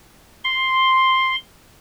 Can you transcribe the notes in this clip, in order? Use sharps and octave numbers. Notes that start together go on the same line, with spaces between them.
C6